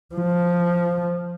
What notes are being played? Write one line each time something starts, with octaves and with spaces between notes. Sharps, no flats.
F3